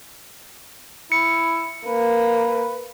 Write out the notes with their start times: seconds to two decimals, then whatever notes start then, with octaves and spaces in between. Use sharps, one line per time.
1.12 E4 C#7
1.86 A#3 B4